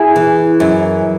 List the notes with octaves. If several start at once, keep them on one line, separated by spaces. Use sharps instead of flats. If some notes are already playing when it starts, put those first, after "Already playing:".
Already playing: E4 G#4
E3
F#2